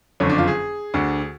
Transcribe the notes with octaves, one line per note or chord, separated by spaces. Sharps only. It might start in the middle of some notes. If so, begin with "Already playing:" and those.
F#1 F2 D3 C#4
D4
F4
G#4
D2 D3